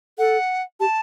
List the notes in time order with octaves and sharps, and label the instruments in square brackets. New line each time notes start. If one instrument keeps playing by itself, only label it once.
[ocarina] A4 [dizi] F#5
[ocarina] G4 [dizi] A5